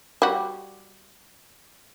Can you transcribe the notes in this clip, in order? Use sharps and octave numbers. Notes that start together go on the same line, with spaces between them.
G3 F#4